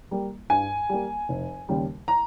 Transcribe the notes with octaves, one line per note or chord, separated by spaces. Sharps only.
G3 A#3
G2 G#5
G3 A#3
F1
D#2 C#3 G3
A#5